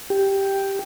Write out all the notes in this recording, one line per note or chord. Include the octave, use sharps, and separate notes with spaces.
G4